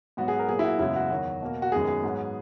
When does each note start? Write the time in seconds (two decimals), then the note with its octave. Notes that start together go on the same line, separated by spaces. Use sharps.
0.17 G#2 F#3 B3 F#4
0.28 G#4
0.39 A#4
0.48 A#2 F#3 A#3 G#4
0.59 E4
0.64 F#4
0.79 F#2 C#3 G#3 B3 E4
0.96 F#4
1.10 E2 D#3 F#3
1.42 B2 A#3
1.62 F#4
1.72 F#2 D#3 G#3 B3 G#4
1.88 G#4
2.03 G#2 F#3 B3